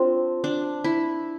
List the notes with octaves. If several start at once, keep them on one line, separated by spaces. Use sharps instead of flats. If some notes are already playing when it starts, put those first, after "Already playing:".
Already playing: C4 D4 F4
D4
E4